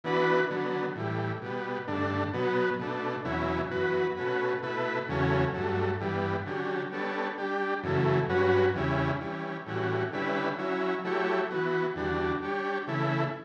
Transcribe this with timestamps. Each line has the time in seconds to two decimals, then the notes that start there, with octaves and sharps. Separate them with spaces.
0.04 E3 B3 D4 F#4 B4
0.50 D3 F#3 B3
0.96 A2 E3 G3
1.42 B2 G3 B3
1.88 G2 D3 A3 D4
2.33 B2 F#3 B3
2.79 B2 A3 D4
3.25 E2 B2 F#3 C#4 E4
3.71 F#2 E3 B3 F#4 B4
4.16 B2 A3 C#4 F#4 B4
4.62 B2 A3 E4 B4
5.08 E2 C#3 F#3 A3 C#4
5.54 G2 F#3 A3
6.00 G2 E3 G3 B3
6.46 D3 F#3 C#4 G4
6.91 G3 B3 D4 A4 C#5
7.38 G3 D4 G4
7.83 F#2 C#3 E3 A3
8.29 G2 F#3 C#4 F#4 B4
8.75 E2 C#3 G3 C#4 E4
9.21 E3 G3 C#4
9.66 A2 E3 G3 C#4 F#4
10.12 D3 G3 C#4 E4 B4
10.58 F#3 C#4 E4
11.04 F#3 A3 E4 G4 C#5
11.50 E3 B3 F#4
11.95 E2 D3 G3 D4 F#4
12.42 G3 D4 G4 C#5
12.87 C#3 E3 A3 E4